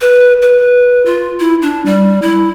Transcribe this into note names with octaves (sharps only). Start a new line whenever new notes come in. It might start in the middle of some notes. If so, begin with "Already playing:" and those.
B4
B4
F4
E4
D4
G3
E4